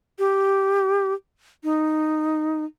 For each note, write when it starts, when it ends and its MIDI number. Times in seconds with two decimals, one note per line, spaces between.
0.19 1.13 67
1.64 2.65 63